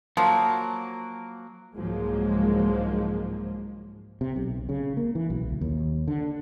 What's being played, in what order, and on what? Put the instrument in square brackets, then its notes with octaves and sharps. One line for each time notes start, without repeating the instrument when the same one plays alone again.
[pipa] F3 [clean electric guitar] F#3 A#3
[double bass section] C2 G#2 F3 F#3 G#3 A#3
[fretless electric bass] C3
B1
C#3
A#3
E3
B1
D2
D#2
D3